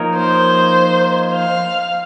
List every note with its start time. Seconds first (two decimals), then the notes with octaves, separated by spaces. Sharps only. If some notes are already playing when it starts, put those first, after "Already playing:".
Already playing: F3 A#3 D#4 A#4 C#5
0.16 C5
1.33 F5